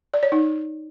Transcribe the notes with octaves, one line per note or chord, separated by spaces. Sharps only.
D5
C#5
D#4